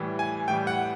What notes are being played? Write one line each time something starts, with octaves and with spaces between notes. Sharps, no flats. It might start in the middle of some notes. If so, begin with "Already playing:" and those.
Already playing: A2 E3 G3
G#5
A2 E3 G3 G5
F#5